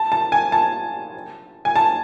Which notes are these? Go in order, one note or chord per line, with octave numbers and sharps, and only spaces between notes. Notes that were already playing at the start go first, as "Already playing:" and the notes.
Already playing: A5
A5
G#5
A5
G#5
A5